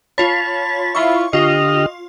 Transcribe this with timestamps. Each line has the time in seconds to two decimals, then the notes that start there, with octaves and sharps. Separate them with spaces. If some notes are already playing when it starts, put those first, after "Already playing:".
0.18 F4 C#5 A5 B5
0.95 E4 F4 C#6
1.33 D3 F4 G4 D#5 F6